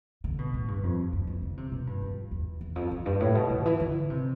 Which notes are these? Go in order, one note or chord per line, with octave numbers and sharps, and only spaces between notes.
D3
B2
A2
G2
F2
F2
E3
D3
C3
B2
G2
F2
E2
E2
F2
F2
G2
A2
B2
D3
E3
D3
C3